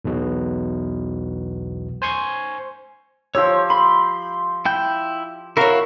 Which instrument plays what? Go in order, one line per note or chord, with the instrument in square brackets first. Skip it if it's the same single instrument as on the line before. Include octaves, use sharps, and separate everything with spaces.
[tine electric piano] B1 E2 B2
C5 G#5 C6 C#6 G#6
[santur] F3 G4 E6 [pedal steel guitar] C#5
[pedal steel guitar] B5 [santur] C6
[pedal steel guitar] E4 G5 G6
[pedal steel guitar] E4 F#4 F5 [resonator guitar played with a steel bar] A#4 C#5